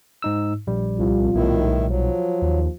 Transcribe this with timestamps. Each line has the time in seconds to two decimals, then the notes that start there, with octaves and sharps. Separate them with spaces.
0.22 G#2 D#4 E6
0.67 A#1 G3
0.99 C2 F4
1.35 B1 A2 D#3 E4
1.89 F3 F#3
2.42 D#2